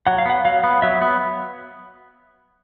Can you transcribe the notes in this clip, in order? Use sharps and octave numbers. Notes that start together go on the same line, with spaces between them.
F#3 F#5
F5
B3 F#5
F#3 F5
B3
F#3 E5
B3